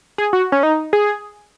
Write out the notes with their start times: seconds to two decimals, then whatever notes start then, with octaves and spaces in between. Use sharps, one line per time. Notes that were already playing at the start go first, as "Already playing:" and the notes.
0.18 G#4
0.33 F#4
0.52 C#4
0.63 D#4
0.93 G#4